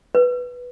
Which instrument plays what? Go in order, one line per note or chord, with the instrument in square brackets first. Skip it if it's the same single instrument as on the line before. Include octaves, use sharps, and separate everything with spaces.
[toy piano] B4